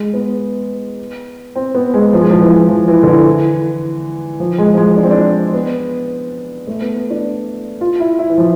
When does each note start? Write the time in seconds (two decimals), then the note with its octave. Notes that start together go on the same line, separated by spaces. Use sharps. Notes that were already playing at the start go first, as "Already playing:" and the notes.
Already playing: G#3
0.13 B3
1.56 C4
1.75 B3
1.94 G#3
2.13 F3
2.21 G#3
2.31 F3
2.41 E3
2.69 F3
2.88 E3
3.03 D3
3.07 E3
4.40 F3
4.58 G#3
4.74 F3
4.77 G#3
4.96 D4
5.03 C4
5.11 D4
5.53 B3
6.67 A3
6.81 B3
7.10 D4
7.81 F4
8.00 E4
8.19 E4
8.29 E3
8.38 F3